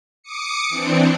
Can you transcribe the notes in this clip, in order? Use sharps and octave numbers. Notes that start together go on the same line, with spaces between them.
D6 D#6 C#7
E3 C4 D4